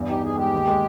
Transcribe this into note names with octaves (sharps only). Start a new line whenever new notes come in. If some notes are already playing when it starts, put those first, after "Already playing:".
Already playing: E2 G2
D#4 G4
D#4 G#4
G#3 G4
D#2
G#3